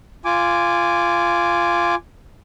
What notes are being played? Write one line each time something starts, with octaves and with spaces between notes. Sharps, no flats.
F4 G#5 D6